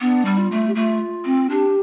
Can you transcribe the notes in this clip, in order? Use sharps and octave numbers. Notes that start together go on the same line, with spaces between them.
B3 D4
G3
F4
A3
G4
A3 F4
C4
D4 G4